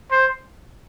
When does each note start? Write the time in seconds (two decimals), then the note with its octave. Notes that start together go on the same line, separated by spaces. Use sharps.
0.12 C5